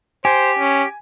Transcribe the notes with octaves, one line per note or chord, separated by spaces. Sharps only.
G4 C5 G#5
C#4